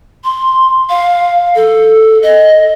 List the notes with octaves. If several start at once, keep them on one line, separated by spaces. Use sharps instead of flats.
C6
F5
A4
D#5